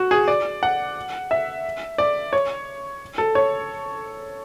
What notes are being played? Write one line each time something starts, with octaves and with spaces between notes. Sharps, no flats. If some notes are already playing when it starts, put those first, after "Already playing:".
Already playing: F#4
G#4
D5
F#5
E5
D5
C#5
A4
C#5